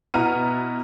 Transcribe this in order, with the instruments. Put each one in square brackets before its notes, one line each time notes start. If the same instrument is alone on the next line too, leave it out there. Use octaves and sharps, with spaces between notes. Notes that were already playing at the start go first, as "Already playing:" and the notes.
[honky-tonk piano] B2 B3 E4 A#5 F6 D#7